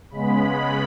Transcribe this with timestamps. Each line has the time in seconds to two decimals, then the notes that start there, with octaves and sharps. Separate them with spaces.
0.11 C#3 G#3 B3 B5